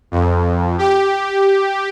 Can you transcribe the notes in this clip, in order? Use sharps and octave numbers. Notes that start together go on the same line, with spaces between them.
F2
G4